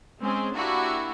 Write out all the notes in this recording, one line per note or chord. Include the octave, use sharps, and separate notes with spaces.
G#3 C4 C#4 G#4
A#3 D4 E4 F#4 G4